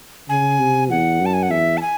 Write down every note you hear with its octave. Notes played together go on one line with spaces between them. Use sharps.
C#3 G#5
C3
E2 F#5
F#2
A5
G#5
F#5
E2 E5
A5
G#5